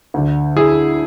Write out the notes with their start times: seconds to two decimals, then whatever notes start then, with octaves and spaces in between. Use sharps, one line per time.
0.14 D2 D3
0.57 E4 G#4